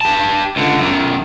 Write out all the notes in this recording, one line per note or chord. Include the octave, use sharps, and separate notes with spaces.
G4 A5
C#2 D3
F#2 D#3